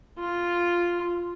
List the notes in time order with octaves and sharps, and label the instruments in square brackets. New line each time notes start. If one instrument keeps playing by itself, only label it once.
[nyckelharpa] F4